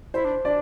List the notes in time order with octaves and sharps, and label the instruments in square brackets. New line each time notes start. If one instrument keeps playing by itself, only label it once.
[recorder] E4 [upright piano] C5
[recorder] D4
[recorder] D4 [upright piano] D5